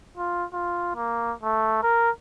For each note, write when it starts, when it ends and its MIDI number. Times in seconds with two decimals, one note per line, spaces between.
0.18 0.45 65
0.53 0.92 65
0.95 1.33 58
1.43 1.79 57
1.83 2.10 70